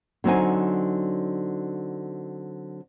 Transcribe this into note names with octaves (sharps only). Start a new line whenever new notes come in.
D3 F#3 C4 D#4 G#5